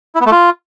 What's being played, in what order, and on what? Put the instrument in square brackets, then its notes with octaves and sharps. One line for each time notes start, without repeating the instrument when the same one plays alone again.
[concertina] E4
B3
A3
F4